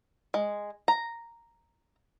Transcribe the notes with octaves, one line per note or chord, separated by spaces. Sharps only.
G#3
A#5